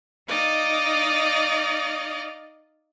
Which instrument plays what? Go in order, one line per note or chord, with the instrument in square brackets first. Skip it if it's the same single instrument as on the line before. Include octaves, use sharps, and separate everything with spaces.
[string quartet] D#4 D5 D#5 F5